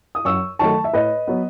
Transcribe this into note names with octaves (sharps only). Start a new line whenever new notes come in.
D#6
F#2 C#6 E6
D#3 F#3 A3 A5 C#6
E5
A2 B4 D#5
F#3 B3